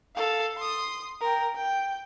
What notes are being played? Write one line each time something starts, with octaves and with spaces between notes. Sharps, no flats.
A4 F5
C6 D#6
A#4 G5
G5